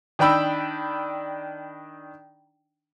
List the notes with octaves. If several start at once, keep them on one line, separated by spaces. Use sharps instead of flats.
D#3 D4 G5 B5 E6